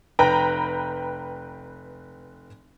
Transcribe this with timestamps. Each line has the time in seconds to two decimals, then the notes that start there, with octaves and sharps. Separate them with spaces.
0.19 F1 B4 G5 A#5